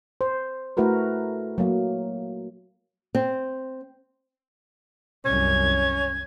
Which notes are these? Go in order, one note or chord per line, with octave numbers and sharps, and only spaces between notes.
C5
A3 E4 F#4 A#4 B4
F#3 A#3
C4
C2 F#2 C#4 G#6